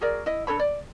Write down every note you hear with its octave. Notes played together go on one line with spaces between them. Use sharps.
F#4 G#4 A#4 D5
E4 D#5
D4 A4 C#5 B5
D5